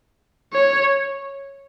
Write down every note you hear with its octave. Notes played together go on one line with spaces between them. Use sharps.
C#5